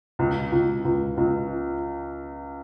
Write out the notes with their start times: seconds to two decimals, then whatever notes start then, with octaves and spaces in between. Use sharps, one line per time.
0.19 C#2
0.52 C#2
0.85 C#2
1.17 C#2